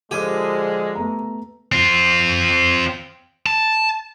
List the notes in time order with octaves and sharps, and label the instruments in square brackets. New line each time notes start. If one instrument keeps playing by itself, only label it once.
[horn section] D3 F3 [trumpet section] G#3 [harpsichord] G4 G#5
[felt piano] A3 B3 A#5
[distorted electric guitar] C4 F4
A5